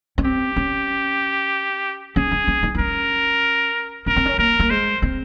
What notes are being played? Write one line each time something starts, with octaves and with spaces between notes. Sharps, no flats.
C#4
C4 G4
C#4
C#4 G#4
C#4
C#4
D#4
D#4
C#4 A#4
C#4 A#4
C4
C#4
A#3 A#4
A#3
G#3 C5
C4